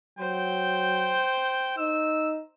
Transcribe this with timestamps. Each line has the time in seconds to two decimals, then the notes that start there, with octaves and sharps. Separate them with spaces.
0.19 F#3 C5 G5
1.78 D#4 E6